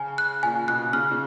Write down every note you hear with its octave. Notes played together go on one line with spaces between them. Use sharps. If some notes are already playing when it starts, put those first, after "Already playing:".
Already playing: C#3 G#5
F#6
A#2 G#5
B2 F#6
C#3 F6
C#3